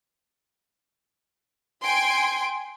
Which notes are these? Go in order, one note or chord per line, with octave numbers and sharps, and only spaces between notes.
G5 G#5 C6 D7